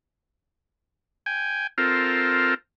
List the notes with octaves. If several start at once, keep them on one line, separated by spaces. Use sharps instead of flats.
G5 G#5
C4 F4 A4 A#4